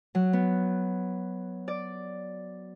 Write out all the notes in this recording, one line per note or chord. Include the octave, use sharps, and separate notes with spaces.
F#3
B3
D5